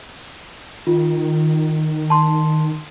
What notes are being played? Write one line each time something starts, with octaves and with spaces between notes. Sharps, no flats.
D#3 F4
A5 C6